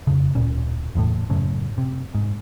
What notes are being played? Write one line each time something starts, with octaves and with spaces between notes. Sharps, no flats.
F2 C#3
D1 A#2 C#4
F#1 E2 A2
F#2 A2 C#3
C3
G#2